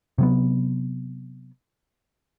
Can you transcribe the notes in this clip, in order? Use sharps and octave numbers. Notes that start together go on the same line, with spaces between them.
C3 F#3 B3